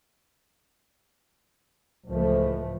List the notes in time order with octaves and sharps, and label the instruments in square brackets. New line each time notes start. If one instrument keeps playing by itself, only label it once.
[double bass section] C#2 A2 E3 F3 A3